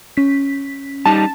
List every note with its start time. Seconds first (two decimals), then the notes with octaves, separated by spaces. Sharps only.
0.17 C#4 B6
1.06 G3 D#4 A5